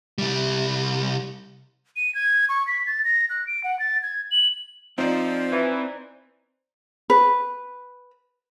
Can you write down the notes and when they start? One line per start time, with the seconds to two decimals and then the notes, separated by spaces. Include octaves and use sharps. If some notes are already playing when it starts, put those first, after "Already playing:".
0.18 C2 G3
1.96 D#7
2.15 G#6
2.49 C#6
2.67 B6
2.86 A6
3.04 A#6
3.30 F#6
3.47 D7
3.64 F#5
3.79 A6
4.02 G#6
4.31 F#7
4.98 F3 C4 D#4 C5 D5
5.52 E3
7.10 B4